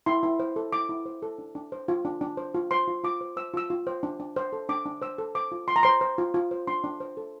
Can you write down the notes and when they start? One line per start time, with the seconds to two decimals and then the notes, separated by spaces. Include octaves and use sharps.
0.06 E4 C6
0.23 E4
0.40 C5
0.56 A4
0.73 E4 D6
0.89 E4
1.06 C5
1.22 A4
1.38 D4
1.55 D4
1.72 C5
1.88 F4
2.05 D4
2.21 D4
2.37 C5
2.54 F4
2.71 C5 C6
2.88 F4
3.04 F4 D6
3.21 C5
3.37 C5 E6
3.54 F4 E6
3.70 F4
3.87 C5
4.03 D4
4.20 D4
4.36 C5
4.53 A4
4.69 D4 D6
4.86 D4
5.02 C5 E6
5.18 A4
5.35 C5 D6
5.52 F4
5.68 F4 C6
5.76 A#5
5.83 C5 C6
6.01 C5
6.18 F4
6.34 F4
6.51 C5
6.67 D4 C6
6.84 D4
7.00 C5
7.17 A4